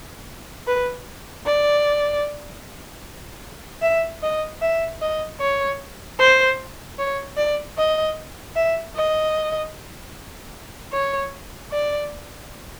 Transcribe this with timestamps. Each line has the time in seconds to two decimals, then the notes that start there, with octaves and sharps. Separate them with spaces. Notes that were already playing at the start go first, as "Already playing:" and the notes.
0.67 B4
1.46 D5
3.82 E5
4.23 D#5
4.62 E5
5.02 D#5
5.40 C#5
6.19 C5
6.98 C#5
7.37 D5
7.78 D#5
8.56 E5
8.96 D#5
10.93 C#5
11.72 D5